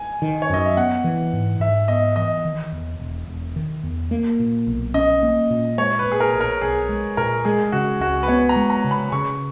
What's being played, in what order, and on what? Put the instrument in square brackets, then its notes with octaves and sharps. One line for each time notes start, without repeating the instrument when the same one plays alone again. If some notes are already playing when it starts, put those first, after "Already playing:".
Already playing: [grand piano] G#5
[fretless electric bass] D#3
[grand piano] C#5
[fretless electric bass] F#2 [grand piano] D#5
[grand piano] E5
[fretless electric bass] B3 [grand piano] F#5
[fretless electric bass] E3
G#2
[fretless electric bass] G#2 [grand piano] E5
[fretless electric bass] B3 [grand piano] D#5
[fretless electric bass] E3 [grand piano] D#5
[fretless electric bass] D#3
E2
E1
E1
D#3
E2
A#3
A#2
B1
[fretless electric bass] C#4 [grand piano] D#5
[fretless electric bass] A#3
A#2
[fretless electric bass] G#3 [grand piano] C#5
[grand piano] B4
[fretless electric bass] A#2
[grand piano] G#4
A#4
[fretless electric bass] B1
[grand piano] A#4
[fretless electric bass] B1 [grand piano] G#4
[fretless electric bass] G#3
[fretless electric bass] A#2 [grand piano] A#4
[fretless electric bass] G#3 [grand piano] G#4
[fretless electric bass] C#3 [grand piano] F#4
[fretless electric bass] C#2 [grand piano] F#4
[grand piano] B4
[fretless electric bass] B3 [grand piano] C#5
[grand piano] A#5
[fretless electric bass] G#3
[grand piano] A#5
[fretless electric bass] C#3
[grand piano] B5
[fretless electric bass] C#3 [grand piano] C#6